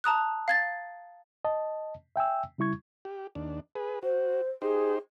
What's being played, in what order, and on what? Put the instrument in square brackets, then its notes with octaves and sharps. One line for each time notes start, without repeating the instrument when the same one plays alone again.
[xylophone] A5 A#5 D#6 F#6
F5 G#6 A6
[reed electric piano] D#5 A5
E5 G5 G#5 E6
C#3 G3 E4 C#6 G#6
[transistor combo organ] G4
D#2 D4
G#4 B4
[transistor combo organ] F#4 [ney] C5
[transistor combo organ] D#4 G4 C5 [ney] G#4